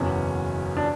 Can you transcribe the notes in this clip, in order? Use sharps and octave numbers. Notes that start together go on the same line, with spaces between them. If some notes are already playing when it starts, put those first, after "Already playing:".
Already playing: F#1 E2 B2 C#4
D4